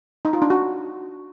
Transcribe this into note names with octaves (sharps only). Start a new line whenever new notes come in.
D#4
F4
D4
F#4